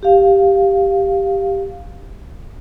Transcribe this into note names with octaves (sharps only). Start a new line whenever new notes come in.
G4 F5